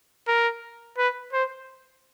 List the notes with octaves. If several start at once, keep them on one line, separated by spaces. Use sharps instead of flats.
A#4
B4
C5